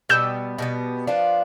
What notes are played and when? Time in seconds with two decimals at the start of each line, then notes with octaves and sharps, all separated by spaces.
0.09 B2 G3 B3 E6 G6
0.58 B2 G3 B3
1.07 F3 B3 D4 F4